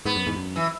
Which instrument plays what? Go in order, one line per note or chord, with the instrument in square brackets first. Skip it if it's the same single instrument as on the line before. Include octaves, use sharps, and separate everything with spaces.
[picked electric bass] G#2 [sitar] B3
[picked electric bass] F#2
E2 G#2
F#2
[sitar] E3